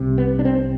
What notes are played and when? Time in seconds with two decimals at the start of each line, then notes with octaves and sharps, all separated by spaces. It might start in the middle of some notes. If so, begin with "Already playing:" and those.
Already playing: C2 C3
0.18 B3
0.39 D4
0.45 C4